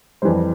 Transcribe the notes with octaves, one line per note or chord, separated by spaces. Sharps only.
F2 E3 G3 C5